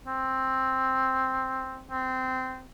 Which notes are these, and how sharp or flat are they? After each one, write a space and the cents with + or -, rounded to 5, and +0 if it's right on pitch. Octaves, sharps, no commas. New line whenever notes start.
C4 +5
C4 -15